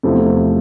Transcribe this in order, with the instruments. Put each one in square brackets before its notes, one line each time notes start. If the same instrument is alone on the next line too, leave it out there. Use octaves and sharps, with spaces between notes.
[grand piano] E2 C3 F3 A3 E4